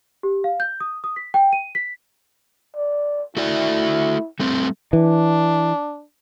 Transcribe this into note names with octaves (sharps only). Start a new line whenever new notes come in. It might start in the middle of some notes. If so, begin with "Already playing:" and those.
G4
F5
G6
D#6
D#6
B6
G5
D#7
B6
D5
A3 E4 F#4 D5
G3 A3 C4
E3 D4